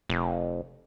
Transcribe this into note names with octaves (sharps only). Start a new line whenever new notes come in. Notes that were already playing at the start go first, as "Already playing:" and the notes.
F1